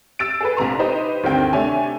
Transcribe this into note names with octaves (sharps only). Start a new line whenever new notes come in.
E6 A6 D7
G#4 A4 B4
A#1 C3 A#5 C6
D#4 G4 B4 C5 D#5
D2 G2 D#3 C4 G5
C3 A3 D4 C#5 G#5